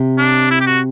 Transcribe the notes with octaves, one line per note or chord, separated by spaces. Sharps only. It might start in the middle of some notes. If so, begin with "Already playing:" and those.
Already playing: C3
D4
E4
G4
F#4